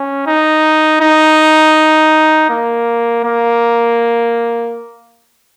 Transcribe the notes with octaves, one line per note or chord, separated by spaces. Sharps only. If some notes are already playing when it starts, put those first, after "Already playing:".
Already playing: C#4
D#4
D#4
A#3
A#3